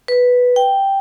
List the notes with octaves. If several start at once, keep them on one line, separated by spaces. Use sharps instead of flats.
B4
G5